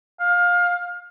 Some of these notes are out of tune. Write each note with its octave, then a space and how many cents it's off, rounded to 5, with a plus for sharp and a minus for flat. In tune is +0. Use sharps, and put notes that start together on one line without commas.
F5 +20